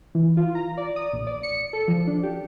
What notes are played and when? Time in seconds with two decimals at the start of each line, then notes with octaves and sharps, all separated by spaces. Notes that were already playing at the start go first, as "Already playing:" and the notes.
0.15 E3
0.37 F4
0.55 A#5
0.77 D5
0.96 D#6
1.13 A#1
1.27 D5
1.43 C#7
1.73 A4
1.88 F3
2.07 D4
2.23 G4